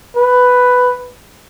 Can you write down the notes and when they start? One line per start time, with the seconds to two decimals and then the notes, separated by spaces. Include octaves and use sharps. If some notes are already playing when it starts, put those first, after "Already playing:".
0.16 B4